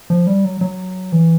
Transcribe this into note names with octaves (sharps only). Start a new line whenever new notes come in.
F3
G3
F#3
F#3
E3